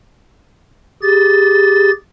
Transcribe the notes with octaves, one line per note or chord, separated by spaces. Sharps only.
G4 G#4 A6